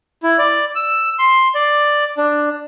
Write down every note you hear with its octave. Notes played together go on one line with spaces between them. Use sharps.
E4
D5
E6
C6
D5
D4